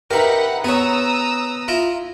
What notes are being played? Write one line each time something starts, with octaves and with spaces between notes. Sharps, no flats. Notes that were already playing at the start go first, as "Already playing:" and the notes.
D#4 G4 A#4 B4 E5 F#5 A#5 B5
B3 G#4 C#5 A#5 D#6 E6
E4 F4 A#5